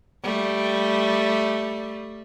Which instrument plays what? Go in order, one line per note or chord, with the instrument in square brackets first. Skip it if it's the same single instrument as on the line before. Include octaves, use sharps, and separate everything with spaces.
[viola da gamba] G3 A3